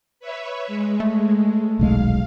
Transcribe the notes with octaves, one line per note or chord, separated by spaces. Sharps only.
B4 C#5 E5
G#3
A3
D#1 B1 G#3 F5